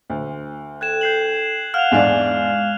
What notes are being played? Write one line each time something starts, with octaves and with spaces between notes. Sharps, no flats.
D2
A4 G5 F#6 G#6 E7
G6 C7 F#7
F5 F#5 F6 F#6 F7
E2 G#2 G#3 D4 F5